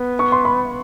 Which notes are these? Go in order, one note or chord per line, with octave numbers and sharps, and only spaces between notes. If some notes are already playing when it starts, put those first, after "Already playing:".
Already playing: B3
C#6
C6
B5